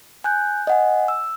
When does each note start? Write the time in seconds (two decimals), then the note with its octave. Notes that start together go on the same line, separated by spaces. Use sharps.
0.24 G#5 F#6 G6
0.67 D#5 F#5 G#5
1.08 E6